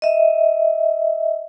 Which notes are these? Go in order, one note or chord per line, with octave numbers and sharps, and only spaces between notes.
D#5 E5